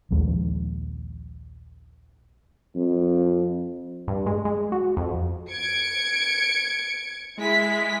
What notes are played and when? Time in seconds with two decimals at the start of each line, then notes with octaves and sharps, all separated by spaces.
0.11 A#1 D#2 F3 G#3
2.76 F2
4.08 G2
4.26 G#3
4.45 G#3
4.72 F#4
4.97 F2
5.50 G#6 C#7 D7
7.38 G#3 E4 G#4 B6